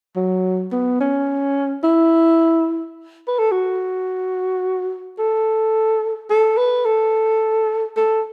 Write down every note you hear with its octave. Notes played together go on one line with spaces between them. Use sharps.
F#3
B3
C#4
E4
B4
A4
F#4
A4
A4
B4
A4
A4